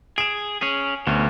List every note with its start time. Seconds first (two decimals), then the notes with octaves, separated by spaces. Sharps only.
0.18 G#4 D7 E7
0.61 C#4 G#4
1.07 D2 B2 C#4